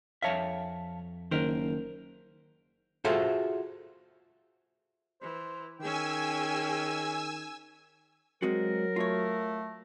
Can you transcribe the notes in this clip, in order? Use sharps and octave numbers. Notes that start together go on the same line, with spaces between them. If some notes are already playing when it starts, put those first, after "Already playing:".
F2 C#5 E5 F5 A5
F#1 D#3 A#4 C5
F4 F#4 G#4 A4 C5 E5
E3 C5
D#3 C#4 G#4 G5 G#5 E6
F#3 G#3 C4 F#4 A#4
A3 F4 C#5